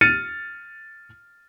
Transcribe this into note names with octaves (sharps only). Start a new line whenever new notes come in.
F6 A6 C#7 D#7